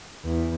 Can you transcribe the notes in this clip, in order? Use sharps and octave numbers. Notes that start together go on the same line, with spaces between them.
E2